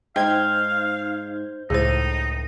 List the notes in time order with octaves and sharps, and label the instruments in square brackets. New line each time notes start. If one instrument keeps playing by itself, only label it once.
[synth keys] G#2 G#6 [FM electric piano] D#4 C5 G6 [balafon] D#5 G5 [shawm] F5
[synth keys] C#2 A2 D#7 [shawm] D#4 [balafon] G#4 C5